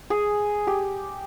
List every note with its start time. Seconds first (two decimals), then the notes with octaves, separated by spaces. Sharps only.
0.10 G#4
0.67 G4